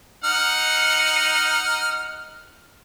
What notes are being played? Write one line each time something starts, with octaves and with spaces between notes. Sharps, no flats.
D#4 F#5 F6